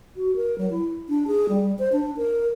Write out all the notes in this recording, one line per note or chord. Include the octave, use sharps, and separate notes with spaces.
F#4
A#4
F#3
E4
D4
G#4
G3
C5
D4
A#4